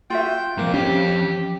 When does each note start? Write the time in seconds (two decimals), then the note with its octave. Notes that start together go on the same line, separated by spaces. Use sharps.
0.10 F4 F#4 E5 G5
0.57 F2 G#2 A#3
0.74 C#4 G4